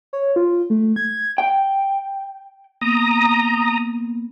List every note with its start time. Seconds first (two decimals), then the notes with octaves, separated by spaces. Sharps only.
0.13 C#5
0.36 F4
0.70 A3
0.96 G#6
1.38 G5
2.81 A#3 B3 A#5 D#6